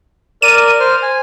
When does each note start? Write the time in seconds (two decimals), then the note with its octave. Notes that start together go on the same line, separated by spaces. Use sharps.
0.42 A#4 D5 D#7
0.80 C5 F6
1.03 G#5